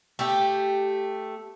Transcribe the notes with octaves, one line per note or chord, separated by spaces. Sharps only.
A3 G4